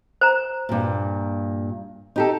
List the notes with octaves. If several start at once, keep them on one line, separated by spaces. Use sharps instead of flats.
C5 A#5
G2 A#2
D#4 G4 A4